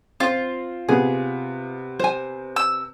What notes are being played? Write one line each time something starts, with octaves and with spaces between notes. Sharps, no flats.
C4 F4
C3 B3 G#4
C5 G#5
E6